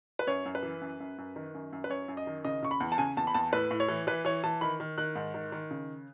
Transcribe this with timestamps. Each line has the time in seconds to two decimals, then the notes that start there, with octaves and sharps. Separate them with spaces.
0.19 B4
0.27 F#2 C#5
0.46 F#2
0.55 B4
0.63 E3
0.81 F#2
1.00 F#2
1.18 F#2
1.36 D#3
1.54 F#2
1.73 F#2
1.84 B4
1.89 F#2 C#5
2.08 F#2
2.17 D#5
2.27 D#3
2.45 C#3 D#5
2.62 C#3 C#6
2.71 B5
2.80 E2
2.92 A5
2.98 C#3 G#5
3.17 E2 A5
3.27 B5
3.34 E2 A5
3.53 A2 B4
3.71 A2
3.80 C#5
3.89 E3
4.07 E3 B4
4.25 E3 C#5
4.44 E3 A5
4.61 D#3 B5
4.80 D#3
4.98 D#3 F#6
5.16 G#2
5.34 D#3
5.52 D#3
5.71 C#3